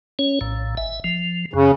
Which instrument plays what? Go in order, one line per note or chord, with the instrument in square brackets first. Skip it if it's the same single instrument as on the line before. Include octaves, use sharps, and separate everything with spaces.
[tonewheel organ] C#4 C#5
A#1 A2
G#1 E5
F3
[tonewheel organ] F#2 [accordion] C#3